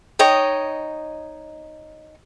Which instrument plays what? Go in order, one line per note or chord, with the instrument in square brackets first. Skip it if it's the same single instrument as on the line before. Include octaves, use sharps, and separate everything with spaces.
[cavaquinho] D#4 C#5 D#5 G5